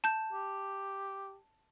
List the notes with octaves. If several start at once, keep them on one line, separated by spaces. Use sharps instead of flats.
A5 G6
G4